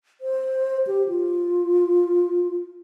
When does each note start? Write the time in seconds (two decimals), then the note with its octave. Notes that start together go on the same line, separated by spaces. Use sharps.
0.21 C5
0.87 G4
1.08 F4